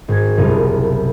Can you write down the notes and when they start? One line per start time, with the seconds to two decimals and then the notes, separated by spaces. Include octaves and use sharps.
0.08 G#1 G#6
0.37 F#1 C2 B2 G3 F4 A#4